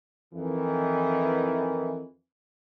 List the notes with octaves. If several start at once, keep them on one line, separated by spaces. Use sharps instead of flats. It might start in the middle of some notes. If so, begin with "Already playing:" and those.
F2 D#3 E3